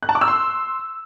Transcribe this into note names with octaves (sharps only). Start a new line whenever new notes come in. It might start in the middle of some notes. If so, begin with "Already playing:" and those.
F#6
A5
D6
E6
C6